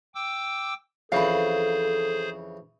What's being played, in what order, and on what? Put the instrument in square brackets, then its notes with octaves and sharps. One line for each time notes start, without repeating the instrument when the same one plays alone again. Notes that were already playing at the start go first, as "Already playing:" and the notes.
[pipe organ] G5 D6 E6
[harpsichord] F2 C#3 E3 [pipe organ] G#4 C5 [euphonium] A4 [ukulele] F5 B5